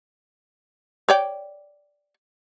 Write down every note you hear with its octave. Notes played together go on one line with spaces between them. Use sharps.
C#5 D5 G5